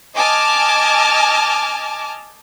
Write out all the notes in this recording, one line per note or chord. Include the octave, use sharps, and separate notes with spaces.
D#5 G#5 A5 D6 F6